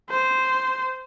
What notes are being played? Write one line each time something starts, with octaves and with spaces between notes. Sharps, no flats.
C5